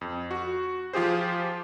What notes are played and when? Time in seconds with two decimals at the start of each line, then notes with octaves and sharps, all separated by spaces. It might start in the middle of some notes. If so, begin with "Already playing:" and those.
0.01 F2
0.31 F#4
0.93 F3 F4 G4 G#4 C5